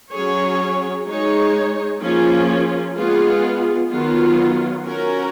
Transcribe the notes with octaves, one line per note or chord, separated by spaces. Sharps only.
F#3 C#4 G#4 C#5
G#3 D#4 G#4 C#5
F3 A#3 C#4 F4 G#4
G#3 B3 F4 G#4
D#3 F#3 B3 F4
C#4 F#4 A#4